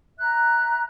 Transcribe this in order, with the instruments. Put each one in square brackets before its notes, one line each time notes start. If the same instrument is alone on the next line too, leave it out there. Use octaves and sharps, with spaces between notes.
[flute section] E5 A#5 F#6